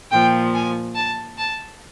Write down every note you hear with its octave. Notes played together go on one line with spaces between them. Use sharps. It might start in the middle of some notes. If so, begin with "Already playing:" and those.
A#2 F3 G5
G#5
A5
A5